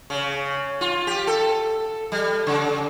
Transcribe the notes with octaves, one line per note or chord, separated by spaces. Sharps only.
C#3
F4
G4
A4
G3
C#3